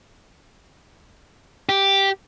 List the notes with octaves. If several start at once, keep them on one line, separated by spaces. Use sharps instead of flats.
G4